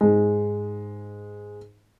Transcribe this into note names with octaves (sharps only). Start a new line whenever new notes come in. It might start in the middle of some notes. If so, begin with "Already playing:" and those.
G#2 G#3